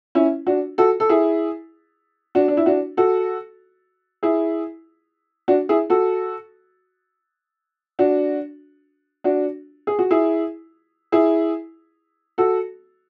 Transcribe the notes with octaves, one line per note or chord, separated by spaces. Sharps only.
C#4 E4
D4 F#4
F#4 A4
A4
E4 G#4
D4 F#4
D4
E4
D4 F#4
F#4 A4
E4 G#4
D4 F#4
E4 G#4
F#4 A4
D4 F#4
D4 F#4
G#4
F#4
E4 G#4
E4 G#4
F#4 A4